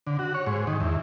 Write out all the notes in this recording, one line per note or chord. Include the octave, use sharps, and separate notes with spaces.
D3
F#4
C#5
G#2
D#3
E2